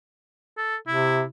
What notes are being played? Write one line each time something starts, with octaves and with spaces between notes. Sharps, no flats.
A4
C3 E4